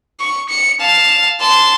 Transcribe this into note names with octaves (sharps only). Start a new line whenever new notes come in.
C#6
C#7
F5 A5
A5 C6